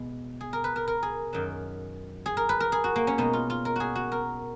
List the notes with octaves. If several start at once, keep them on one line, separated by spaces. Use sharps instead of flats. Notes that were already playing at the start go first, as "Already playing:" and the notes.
Already playing: B2 G#3
G#4
A#4
B4
A#4
A#4
G#4
F#2 D#3 F#3
G#4
A#4
B4
A#4
G#4
F#4
A#3
C#4
B2 G#3 D#4
F4
F4
A#4
F#4 G#4
F#4
A#4